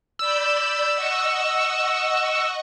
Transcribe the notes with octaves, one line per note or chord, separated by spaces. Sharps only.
D5 B5 E6 G6
D#5 F#5 C#6